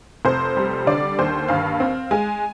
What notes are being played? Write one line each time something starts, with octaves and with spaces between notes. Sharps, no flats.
F1 C5
G3
D3 D5
D#2 C5
G2 F5
C4
G#3 G#5